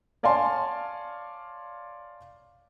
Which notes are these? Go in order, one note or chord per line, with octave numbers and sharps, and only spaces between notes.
C#5 D5 F5 G#5 A5 C6